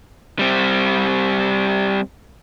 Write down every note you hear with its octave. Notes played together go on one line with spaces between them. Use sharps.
G3 C4